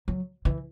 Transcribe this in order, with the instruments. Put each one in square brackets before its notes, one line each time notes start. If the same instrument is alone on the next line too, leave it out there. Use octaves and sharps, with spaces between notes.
[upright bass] F#3
E3